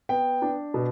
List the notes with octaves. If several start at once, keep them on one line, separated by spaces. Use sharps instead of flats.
B3 G5
D4
B2